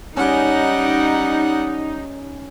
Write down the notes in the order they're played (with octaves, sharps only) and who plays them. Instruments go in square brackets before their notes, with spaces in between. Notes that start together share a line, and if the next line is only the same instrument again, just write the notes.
[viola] G3 F#5 [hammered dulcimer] C#4 [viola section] D#4